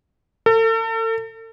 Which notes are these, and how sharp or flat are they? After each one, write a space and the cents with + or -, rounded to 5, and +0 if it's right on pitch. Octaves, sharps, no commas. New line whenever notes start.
A4 +40